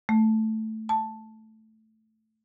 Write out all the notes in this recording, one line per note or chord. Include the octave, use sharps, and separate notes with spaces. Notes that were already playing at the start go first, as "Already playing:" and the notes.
A3
A5